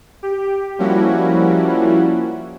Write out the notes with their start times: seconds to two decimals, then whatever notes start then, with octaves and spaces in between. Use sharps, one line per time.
0.23 G4
0.78 F3 G3 A#3 C#4 E4 F#4